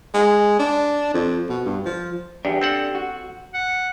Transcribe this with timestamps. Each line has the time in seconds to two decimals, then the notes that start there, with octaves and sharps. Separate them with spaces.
0.14 G#3
0.59 D4
1.14 F2
1.49 B2
1.66 G2
1.85 F3
2.45 E2 D4 G4
2.61 C4 A4 F#5
2.95 F#4
3.54 F#5